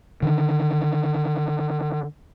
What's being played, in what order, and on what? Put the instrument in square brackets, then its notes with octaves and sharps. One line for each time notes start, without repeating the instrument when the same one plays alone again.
[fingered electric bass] D3 D#3